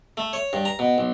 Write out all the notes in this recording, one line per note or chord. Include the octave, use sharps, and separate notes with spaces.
A3
C#5
G2
A#5
B2
B1